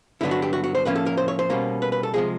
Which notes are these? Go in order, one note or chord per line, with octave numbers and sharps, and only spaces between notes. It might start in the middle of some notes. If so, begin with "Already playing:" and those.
G2 D3 F#3 B3 D4 E4
F#4
G4
F#4
F#4
C5
A2 F3 A#3 C#4 B4
A4
A#4
C5
C#5
C5
B2 G3 A#3 C#4
B4
B4
A4
C3 F3 G#3 G#4